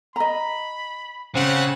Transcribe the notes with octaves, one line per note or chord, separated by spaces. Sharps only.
D#5 A#5 B5
C#3 C4 F#5